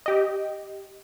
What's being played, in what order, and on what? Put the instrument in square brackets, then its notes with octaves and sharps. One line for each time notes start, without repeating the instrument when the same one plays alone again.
[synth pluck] G4 D#5